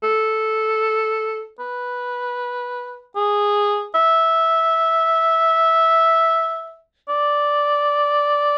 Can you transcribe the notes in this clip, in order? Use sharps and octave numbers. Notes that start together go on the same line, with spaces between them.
A4
B4
G#4
E5
D5